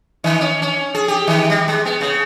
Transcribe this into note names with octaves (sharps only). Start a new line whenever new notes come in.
D#3
C#4
C#4
G#4
G4
D#3
G3
G#3
B3
C#3